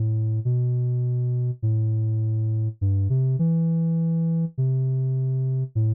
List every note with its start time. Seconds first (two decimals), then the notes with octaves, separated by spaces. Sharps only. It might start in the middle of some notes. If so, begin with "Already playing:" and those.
Already playing: A2
0.45 B2
1.62 A2
2.81 G2
3.10 C3
3.39 E3
4.58 C3
5.75 A2